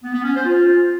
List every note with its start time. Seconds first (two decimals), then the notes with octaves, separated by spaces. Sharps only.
0.02 B3
0.13 B3
0.23 C#4
0.34 C5
0.44 F4